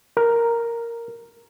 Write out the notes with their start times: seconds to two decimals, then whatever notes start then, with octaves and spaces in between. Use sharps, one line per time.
0.17 A#4